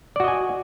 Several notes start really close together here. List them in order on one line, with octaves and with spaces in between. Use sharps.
D5 F#4 D#5 G#5